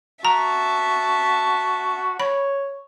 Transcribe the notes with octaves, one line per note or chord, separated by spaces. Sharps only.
F#4 E5 A5 A#5
C#5 B5